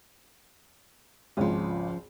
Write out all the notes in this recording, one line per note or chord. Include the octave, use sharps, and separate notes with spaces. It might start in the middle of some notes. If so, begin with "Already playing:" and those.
G#1 C#2 F3 C#4